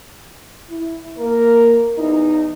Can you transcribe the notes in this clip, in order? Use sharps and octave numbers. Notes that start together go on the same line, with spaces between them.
E4
A#3 A#4
E2 E3 D#4